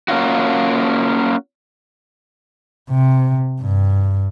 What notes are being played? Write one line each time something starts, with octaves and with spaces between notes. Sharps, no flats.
A#3 C#4 F4 F#4
C3
G2